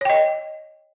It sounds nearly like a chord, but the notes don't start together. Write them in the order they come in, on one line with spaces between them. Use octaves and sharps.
C#5 G5 D#5